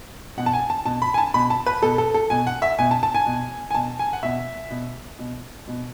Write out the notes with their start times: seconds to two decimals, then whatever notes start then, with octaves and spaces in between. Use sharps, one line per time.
0.37 B2 F#5
0.46 A5
0.53 G#5
0.70 A5
0.86 B2 A5
1.02 B5
1.14 G#5
1.18 A5
1.34 B2 B5
1.50 A5
1.66 B4
1.82 B2 A4
1.98 A4
2.14 A4
2.30 B2 G#5
2.47 F#5
2.62 E5
2.78 B2 G#5
2.91 A5
3.03 A5
3.15 G#5
3.26 B2
3.71 G#5
3.74 B2 A5
3.99 G#5
4.13 F#5
4.23 B2 E5
4.71 B2
5.19 B2
5.68 B2